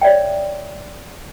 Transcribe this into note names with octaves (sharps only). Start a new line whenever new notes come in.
C#5 D5 E5 G5